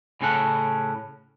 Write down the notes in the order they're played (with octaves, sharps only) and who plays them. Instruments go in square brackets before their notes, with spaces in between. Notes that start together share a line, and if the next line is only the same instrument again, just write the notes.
[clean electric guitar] A2 C#3 C#4 A4 F#5